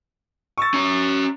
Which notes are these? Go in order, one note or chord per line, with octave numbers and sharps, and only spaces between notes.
C#6 E6 A6
C#4 A#5